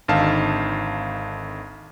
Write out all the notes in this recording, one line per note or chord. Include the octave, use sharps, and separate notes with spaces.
G#1 D3 D#4 F5 A5